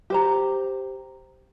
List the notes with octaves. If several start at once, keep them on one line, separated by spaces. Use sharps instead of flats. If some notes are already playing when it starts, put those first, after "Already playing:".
G4 C5 A#5